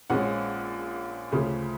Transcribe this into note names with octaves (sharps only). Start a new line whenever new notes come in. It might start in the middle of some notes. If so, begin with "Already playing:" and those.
A#1 A#2 F3 G#3 C#4 F#5
D2 C#3 F3